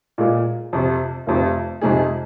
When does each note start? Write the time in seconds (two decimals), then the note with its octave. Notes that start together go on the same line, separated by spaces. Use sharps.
0.18 A#2 G#3 F4
0.73 F2 C3 F3
1.27 F1 F2 C3
1.82 F2 C3 G#3 D#4 G#4